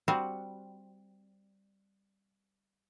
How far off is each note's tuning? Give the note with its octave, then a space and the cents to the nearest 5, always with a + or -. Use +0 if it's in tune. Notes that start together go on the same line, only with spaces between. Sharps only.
G3 +0 C4 +0 F#4 +0